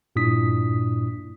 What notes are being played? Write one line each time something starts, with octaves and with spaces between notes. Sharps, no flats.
G2 A#2 D4 E4 D#6 B6